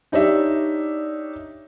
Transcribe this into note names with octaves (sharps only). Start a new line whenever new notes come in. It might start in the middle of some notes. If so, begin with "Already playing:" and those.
D4 D#4 G4 C#5 D5 E5